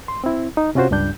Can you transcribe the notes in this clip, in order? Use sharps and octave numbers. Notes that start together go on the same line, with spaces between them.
C6
C4 E4
D#4
C3 C#4 F4 F#4 C5
C#2 G2 G3 D4 G6